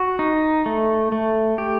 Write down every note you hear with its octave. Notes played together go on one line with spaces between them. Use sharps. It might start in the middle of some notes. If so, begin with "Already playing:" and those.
Already playing: F#4
D#4
A3
A3
G4